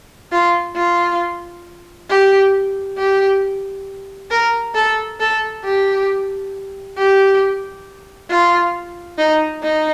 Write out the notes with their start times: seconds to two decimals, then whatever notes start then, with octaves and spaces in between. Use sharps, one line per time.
0.32 F4
0.76 F4
2.09 G4
2.98 G4
4.31 A#4
4.75 A4
5.20 A4
5.64 G4
6.97 G4
8.30 F4
9.18 D#4
9.63 D#4